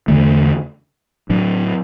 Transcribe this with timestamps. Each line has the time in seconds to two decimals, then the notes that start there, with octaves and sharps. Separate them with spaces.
0.08 E2 D3 A3
1.30 A2 F#3 D4